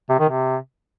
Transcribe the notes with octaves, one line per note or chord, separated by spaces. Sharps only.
C3
D#3
C3